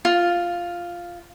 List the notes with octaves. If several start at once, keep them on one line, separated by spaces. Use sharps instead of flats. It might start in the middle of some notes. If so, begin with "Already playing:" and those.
F4